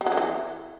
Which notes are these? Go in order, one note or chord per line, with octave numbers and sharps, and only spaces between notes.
G3
F#3
D3
E3